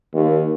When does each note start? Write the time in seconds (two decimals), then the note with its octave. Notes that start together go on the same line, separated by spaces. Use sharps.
0.14 D#2